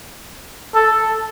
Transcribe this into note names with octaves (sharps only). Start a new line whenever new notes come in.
A4